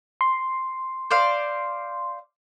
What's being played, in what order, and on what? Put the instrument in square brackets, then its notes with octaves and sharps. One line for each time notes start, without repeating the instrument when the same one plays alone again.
[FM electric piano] C6
[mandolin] C5 D5 F5